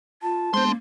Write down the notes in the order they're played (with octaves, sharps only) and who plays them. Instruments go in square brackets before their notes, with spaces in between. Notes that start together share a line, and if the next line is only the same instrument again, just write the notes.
[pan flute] F4 [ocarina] A5
[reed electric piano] G#3 B3 [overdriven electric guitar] D4 C6 [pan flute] C5
[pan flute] A#3